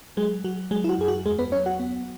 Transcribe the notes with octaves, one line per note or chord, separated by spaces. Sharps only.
F#3 G#3 G#4
F#3 F#4
F#3 G#3 G#4
E4
F#4
F#2 G#4
F#4
E2 G#3 G#4
B3 B4
F#3 C#4 C#5
F#4 F#5
B3